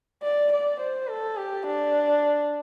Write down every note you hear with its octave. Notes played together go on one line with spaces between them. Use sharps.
D5
D5
C5
A4
G4
D4